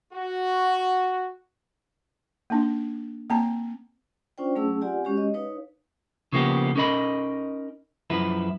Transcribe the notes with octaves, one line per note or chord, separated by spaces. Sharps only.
F#4
A#3 D4 D#4
A#3 C4 A5 A#5
C#4 D4 F4 C5 D5 G5
F#3 A3 C#4 G#4 A5 E6
C4 F4 G4 D5 F#5 G#5
G#3 C#4 F#4 G4 C#5
D#5
D#4 B4 C#5 F5
C#3 F3 A#3 B3 F#4 G4
C#4 D#4 A#4 D#5 B5
F#2 F3 E4 B4